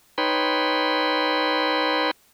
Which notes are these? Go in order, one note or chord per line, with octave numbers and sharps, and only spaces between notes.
D#4 B4 C#5 G5 B5 C6